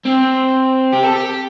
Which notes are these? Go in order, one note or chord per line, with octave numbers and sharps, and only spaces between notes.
C4
G4
A4
G4